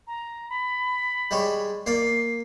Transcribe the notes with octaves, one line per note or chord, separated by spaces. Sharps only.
A#5
B5
G3 G#3 C#5
A#3 D5 C7